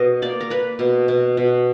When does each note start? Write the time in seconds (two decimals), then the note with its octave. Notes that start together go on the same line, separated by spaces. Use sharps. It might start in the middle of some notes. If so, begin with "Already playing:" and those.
Already playing: B2 D#5
0.22 A#3 D5
0.41 A#4
0.50 A#3 B4
0.79 B2
1.08 B2
1.37 B2